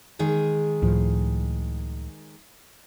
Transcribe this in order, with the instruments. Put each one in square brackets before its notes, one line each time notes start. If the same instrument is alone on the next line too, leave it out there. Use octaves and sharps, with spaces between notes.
[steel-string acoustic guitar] D#3 G#3 G#4
[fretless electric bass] C#2 A2 F3